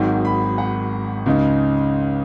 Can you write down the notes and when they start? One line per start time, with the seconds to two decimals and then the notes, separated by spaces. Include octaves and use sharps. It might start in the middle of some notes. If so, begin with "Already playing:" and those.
Already playing: G#1 G#2 D#3 F#3
0.25 B5
0.58 F#5
1.26 C#2 C#3 G#3 D#4